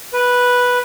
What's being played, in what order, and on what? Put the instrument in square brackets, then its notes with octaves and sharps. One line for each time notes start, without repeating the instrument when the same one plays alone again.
[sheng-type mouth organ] B4